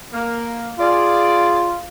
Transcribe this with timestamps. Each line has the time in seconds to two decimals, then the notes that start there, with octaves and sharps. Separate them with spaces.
0.13 A#3
0.79 F4 G#4 D5